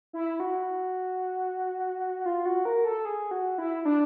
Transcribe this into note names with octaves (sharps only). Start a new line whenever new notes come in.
E4
F#4
F4
F#4
A#4
A4
G#4
F#4
E4
D4